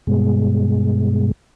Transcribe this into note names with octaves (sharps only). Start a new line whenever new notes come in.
G2 B2 G#3